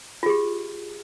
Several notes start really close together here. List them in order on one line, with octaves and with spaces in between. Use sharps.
F4 G#4 G4